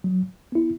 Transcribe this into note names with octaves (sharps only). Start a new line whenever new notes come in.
F#3
B3 E4